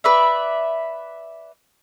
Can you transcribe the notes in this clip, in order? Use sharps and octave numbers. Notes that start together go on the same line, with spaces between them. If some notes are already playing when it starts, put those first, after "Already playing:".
B4 D5 E5